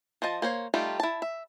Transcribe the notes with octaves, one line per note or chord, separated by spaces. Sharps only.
F3 C5 D#5 A5
A#3 C5 C#5
G3 A3 D#4 F4 G4
E4 A5
E5